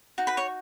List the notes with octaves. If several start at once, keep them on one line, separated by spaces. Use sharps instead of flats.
D#4 F#4
B4 B5
C#5 C#6